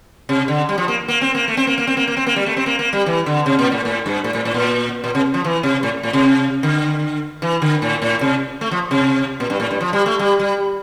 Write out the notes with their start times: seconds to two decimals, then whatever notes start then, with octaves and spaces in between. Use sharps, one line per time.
0.29 C3
0.48 D3
0.69 G3
0.78 F3
0.88 A#3
1.08 A#3
1.21 C4
1.35 A#3
1.48 A3
1.57 C4
1.67 A#3
1.78 A#3
1.87 C4
1.97 A#3
2.08 A#3
2.17 C4
2.27 A#3
2.36 G3
2.46 A3
2.57 C4
2.66 A#3
2.79 A#3
2.93 G3
3.06 E3
3.26 D3
3.46 C3
3.59 A#2
3.72 A2
3.85 A2
4.06 G2
4.24 A2
4.35 A2
4.45 A2
4.54 A#2
5.04 A#2
5.15 C3
5.34 F3
5.44 E3
5.63 C3
5.83 A2
6.03 A2
6.13 C3
6.63 D3
7.42 E3
7.62 D3
7.82 A2
8.02 A2
8.21 C3
8.61 A3
8.71 F3
8.91 C3
9.40 A#2
9.50 G2
9.60 A2
9.71 G2
9.81 F3
9.93 G3
10.06 A3
10.19 G3
10.39 G3